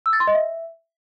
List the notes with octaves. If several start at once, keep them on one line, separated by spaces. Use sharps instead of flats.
E6
A6
C6
D#5
E5